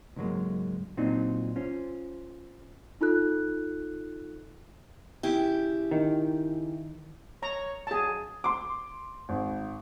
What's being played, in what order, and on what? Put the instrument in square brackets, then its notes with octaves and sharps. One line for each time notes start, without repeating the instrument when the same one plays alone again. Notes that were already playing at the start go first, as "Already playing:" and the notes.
[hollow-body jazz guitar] C#2 G#2 D3 F#3 G#3 A#3
A#2 F#3 C4 D4 D#4 F4
C#4 F4 C5
[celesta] D#4 F4 A4 F#6
[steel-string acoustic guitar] C#3 E4 G4
[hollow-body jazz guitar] D#3
[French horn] C#5 [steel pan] A#5
[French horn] F#3 [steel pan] G#4 A5
[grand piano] C6 D6
G#1